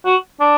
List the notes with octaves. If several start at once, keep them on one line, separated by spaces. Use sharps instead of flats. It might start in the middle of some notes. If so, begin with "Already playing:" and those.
F#4
D4